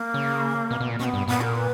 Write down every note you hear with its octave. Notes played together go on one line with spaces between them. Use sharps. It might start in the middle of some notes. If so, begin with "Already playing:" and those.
Already playing: A#3
C#3
B2
B2
A#2
B2 C#4
B3
G2
A#2 B3
A#4
B4